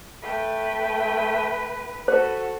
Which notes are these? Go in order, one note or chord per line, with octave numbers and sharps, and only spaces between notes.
A3 B4 G5
F#4 A4 C5